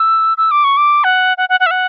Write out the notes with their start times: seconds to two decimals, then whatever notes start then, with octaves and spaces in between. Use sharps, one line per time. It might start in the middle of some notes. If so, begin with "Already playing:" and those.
Already playing: E6
0.38 E6
0.51 D6
0.64 C#6
0.77 D6
1.04 F#5
1.37 F#5
1.49 F#5
1.60 F#5
1.66 E5
1.71 F#5